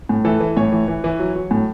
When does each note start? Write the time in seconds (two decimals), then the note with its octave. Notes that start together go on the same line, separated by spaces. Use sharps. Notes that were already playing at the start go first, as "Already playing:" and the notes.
0.09 A2
0.25 E3 A4
0.40 E3
0.57 A2 C#5
0.72 E3
0.88 E3
1.04 E3
1.20 F#3
1.36 F#3
1.51 A2